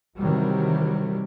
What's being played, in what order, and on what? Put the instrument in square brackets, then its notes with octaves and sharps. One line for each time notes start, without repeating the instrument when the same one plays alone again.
[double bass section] C3 D#3 E3 F#3 G3